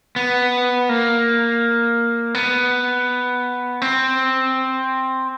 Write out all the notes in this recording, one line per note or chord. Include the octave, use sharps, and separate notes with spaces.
B3
A#3
B3
C4